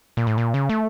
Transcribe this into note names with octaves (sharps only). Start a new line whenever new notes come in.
A#2
A2
A#2
C#3
A3